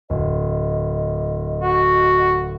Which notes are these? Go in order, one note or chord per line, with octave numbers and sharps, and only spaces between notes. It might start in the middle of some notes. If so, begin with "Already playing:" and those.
D1 D#5
F#4